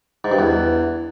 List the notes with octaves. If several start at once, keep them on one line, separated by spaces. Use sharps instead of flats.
G#2
G2
E2